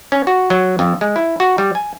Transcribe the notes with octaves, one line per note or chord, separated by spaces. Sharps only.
C#4
F#4
F#3
F2
G#3
E4
F#4
G3
G#5